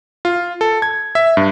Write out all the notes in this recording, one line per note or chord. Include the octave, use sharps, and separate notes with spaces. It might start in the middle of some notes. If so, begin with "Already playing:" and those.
F4
A4
G#6
E5
G2